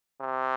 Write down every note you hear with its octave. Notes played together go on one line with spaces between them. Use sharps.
C3